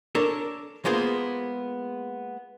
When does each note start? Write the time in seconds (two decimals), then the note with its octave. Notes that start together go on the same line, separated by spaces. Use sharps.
0.15 D4 A4 A#4 C#5
0.85 G#3 A#3 B3 F4 G#4 C5